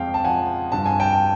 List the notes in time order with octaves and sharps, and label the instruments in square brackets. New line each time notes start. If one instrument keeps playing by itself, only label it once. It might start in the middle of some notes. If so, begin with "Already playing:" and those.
Already playing: [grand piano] F2 G#3 F5 G5
A5
F3 F#5 G#5
G2 A5
G#5
G5 A5